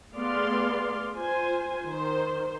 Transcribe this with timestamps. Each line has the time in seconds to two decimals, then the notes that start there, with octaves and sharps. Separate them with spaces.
0.15 A3 B3 G#4 D5 F5 C6
1.16 F4 C5 G#5
1.86 D#3 C5